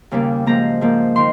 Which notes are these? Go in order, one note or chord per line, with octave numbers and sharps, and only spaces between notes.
D#2 C#3 G3 A#3
G#2 F3 A#3 A#5
G#2 F3 A#3
D#3 C6